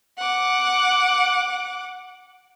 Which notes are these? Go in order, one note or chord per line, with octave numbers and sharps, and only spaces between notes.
F#5 D6